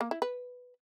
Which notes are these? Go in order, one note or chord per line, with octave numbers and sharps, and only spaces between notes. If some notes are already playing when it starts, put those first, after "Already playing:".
A#3
E4
B4